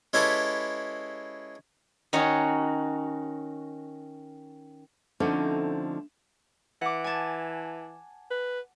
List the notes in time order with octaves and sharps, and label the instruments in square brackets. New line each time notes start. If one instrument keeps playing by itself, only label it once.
[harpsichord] G#3 C#4 E4 G4 A4 B4
[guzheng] D#3 C#4 D#4 F#4 C#5
[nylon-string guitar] D3 F3 A3 C4 C#4 D#4
[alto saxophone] E3 [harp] F#5 D6
[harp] G#5 A5
[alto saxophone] B4